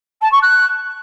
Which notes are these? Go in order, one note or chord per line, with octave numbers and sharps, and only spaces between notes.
A5
C#6
F#6